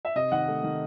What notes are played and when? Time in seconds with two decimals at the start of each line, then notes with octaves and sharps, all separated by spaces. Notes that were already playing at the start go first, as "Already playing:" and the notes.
0.05 E5
0.16 C3 D#5
0.32 D#3 F#5
0.48 A3
0.64 D#3